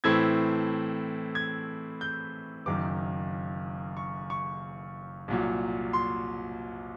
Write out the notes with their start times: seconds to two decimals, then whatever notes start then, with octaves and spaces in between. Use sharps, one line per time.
0.04 A2 E3 A3 C4 E4 G#6
1.35 G#6
2.01 G6
2.66 F#1 F#2 D#3 D6
3.97 C#6
4.30 C#6
5.28 C2 A#2 F#3
5.93 C6